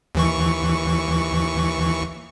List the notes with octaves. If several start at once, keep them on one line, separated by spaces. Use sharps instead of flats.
D#2 E3 C#6